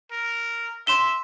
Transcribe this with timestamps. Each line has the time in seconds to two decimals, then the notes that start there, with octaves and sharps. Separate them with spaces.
0.12 A#4
0.87 E5 C6 E7 G7